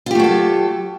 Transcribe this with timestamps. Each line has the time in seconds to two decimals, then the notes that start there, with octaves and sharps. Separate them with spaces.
0.06 F4
0.11 G4
0.15 A3
0.20 F#3
0.24 A4